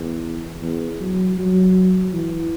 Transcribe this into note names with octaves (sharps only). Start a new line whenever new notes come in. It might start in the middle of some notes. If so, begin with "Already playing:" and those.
Already playing: E2
E2
F#3
F#3
E3